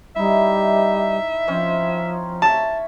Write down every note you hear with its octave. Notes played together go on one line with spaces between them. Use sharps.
G3 D#4 E4 E5
F3 C4 C#4 C5
C#5 E5 A5